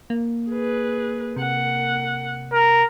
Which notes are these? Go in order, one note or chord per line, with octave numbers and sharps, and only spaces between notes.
A#3
G#4 B4
C3 A#3 F#5
A#4